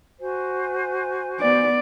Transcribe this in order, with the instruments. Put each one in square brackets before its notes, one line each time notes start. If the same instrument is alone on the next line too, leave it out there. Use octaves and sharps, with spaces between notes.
[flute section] F#4 C5 G#5
[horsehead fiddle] B3 D5